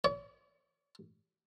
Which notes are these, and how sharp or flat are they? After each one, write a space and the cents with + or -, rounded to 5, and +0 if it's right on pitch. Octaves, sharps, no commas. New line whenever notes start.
C#5 +45